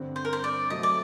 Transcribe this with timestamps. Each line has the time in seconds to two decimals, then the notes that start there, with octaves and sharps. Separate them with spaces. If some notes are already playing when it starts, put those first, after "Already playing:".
Already playing: G2 D3 G3 C4
0.16 C5
0.25 A#4
0.33 C5
0.44 D5
0.70 C3 F#3 A3 D#5
0.83 D5